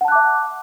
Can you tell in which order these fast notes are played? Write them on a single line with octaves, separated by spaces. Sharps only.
F#5 A5 F#6 D6 E5